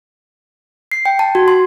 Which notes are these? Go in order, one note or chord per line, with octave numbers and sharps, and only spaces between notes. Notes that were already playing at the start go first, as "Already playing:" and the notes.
C7
G5
A5
F#4
C6